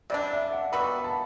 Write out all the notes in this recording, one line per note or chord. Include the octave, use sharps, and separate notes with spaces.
C3 G3 D4 D5
E5
F#5
G3 B3 F#4 A4 B5
A5